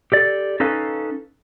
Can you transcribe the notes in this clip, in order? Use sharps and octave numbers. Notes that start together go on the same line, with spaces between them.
G4 A4 D5
C#4 D#4 A4 B4 F5